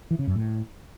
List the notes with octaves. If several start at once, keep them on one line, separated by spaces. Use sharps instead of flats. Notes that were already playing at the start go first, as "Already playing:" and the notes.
E3
C#3
F#2
A2